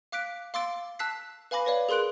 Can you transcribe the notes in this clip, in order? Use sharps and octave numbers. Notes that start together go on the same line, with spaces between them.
F5 D6 F#6 B6 D7
F5 C6 D6 E6 A6 D7
A5 E6 F#6 B6 C7
B4 F5 G#5 B5 D6 A#6
B4 C#5 D5 F5
G#4 A#4 C6 F#6 D7